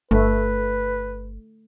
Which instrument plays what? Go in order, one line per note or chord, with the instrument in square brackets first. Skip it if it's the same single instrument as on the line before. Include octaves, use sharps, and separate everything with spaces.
[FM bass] G1 [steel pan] A3 [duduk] B4